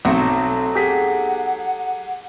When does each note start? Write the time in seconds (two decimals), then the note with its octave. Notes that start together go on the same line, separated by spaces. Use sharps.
0.05 B1 F#3 A3 C4
0.75 G4 G#4 F#5 B6